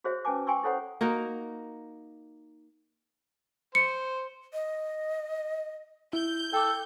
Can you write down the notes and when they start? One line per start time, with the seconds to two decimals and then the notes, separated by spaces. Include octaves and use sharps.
0.04 F#4 G#4 C5 C#5 E5
0.25 C#4 B4 G#5 A5 D6
0.47 G5 G#5 C6 C#6 E6
0.63 E4 A4 C5 C#5 F#5 B5
1.01 A#3 D#4 F#4 A#4
3.75 C5 C#7
4.53 D#5
6.13 E4 G6
6.53 A4 G5 D6